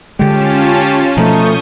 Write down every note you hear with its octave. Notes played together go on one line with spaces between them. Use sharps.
D3 G#3 C#4 F4 G4 A5
B2 F3 A3 D#4 C#6 D#6 G6